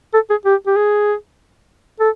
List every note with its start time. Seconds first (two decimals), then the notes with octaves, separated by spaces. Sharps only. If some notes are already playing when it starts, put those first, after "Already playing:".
0.14 A4
0.30 G#4
0.45 G4
0.67 G4
0.76 G#4
2.00 A4